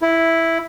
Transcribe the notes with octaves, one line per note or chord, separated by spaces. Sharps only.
E4